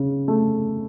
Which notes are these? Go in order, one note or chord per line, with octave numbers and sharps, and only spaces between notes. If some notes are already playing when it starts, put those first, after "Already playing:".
Already playing: C#3 C#4
A3